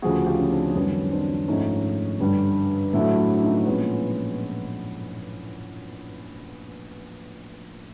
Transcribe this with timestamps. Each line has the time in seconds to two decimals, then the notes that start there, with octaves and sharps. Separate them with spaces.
0.02 D2 C#3 F3 A3 F#4 G#4
0.26 F4 G4
0.39 C#4
0.51 C4 D4
0.75 F#2 D#3 G3 B3 C#4
1.12 C4 D4
1.48 G#2 F3 A3 C#4 D#4
2.20 G2 D3 G3
2.93 A2 F#3 A3 D4 E4
3.17 D4 E4
3.36 E4
3.42 C#4 D#4
3.66 A#2 F3 G#3 B3 C#4